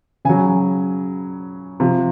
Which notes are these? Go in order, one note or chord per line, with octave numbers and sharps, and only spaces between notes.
C#3 F#3 G#5
C3 F3